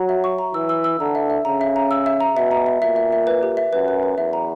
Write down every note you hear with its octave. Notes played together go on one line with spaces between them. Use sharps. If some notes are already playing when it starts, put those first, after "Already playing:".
Already playing: F#3 A#5
E5
C#6
A#5
E3 E6
E6
E6
D3 A#5
E5
E5
C#3 A#5
E5
A#5
E6
E5
A#5
B2 E5
A#5
E5
A#2 E5
E5
E5
B4
G4
E5
F#2 B4
B4
B4
E2 E5
A#5